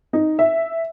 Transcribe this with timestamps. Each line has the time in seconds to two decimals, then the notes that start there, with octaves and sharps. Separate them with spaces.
0.13 D#4
0.39 E5